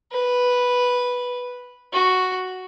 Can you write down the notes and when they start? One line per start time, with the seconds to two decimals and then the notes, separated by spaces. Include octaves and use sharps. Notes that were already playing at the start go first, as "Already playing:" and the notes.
0.12 B4
1.92 F#4